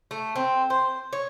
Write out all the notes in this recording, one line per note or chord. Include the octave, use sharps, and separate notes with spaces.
A3
C4
C5
C#5